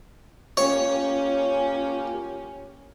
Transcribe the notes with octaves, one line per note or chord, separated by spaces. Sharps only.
A#3 C#4 F4 G4 C#5